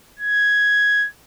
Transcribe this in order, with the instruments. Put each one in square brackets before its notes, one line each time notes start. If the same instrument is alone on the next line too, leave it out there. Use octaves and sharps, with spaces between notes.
[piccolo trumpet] G#6